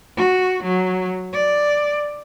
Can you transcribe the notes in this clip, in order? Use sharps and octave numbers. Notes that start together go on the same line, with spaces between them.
F#4
F#3
D5